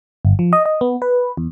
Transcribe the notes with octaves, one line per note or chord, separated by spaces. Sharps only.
G1
F3
D#5
D#5
B3
B4
E2